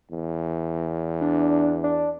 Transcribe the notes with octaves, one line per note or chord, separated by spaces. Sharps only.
E2
D4
D4